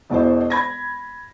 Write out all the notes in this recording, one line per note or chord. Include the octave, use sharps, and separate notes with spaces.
E1 B2 E4 C5
B5 G#6 A#6